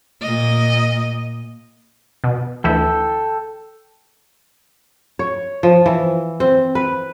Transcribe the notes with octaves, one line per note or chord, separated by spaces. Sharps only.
A#2 D#5
B2
D2 E3 E4 A4 G5
C#5
F3
E3
C4
B4